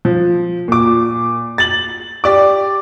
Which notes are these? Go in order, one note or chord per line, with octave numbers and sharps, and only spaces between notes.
F3
A#2 D6
A6 F#7
G4 D5 D6